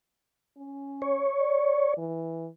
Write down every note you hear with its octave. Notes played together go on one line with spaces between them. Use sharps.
C#4
C#5
D5
E3